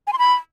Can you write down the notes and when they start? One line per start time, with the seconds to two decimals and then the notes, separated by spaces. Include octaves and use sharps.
0.07 G#5
0.13 C6
0.19 B5